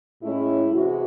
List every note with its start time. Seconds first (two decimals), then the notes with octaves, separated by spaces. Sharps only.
0.22 A2 G#3 C#4 E4
0.74 C3 E3 G#3 F#4